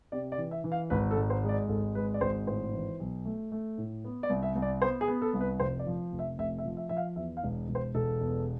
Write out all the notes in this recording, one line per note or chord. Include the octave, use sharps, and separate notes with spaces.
C3 D5
D5
E3
E5
E3
F5
G#1 B4
A4
G#2
C5
G#3
D5
G#1 A4
G#3 B4
D5
G#1 C5
A2 C5
E3
B1
A3
A3
A2
B3
D5
C2
E5
C2
D5
B3 C5
G#4
B3
A4
C2
B4
F1 C5
D5
F3
F1
E5
F1 E5
E5
F3
E5
F3 E5
F5
E2 E5
F5
E1
E1
C5
E1 A4
E2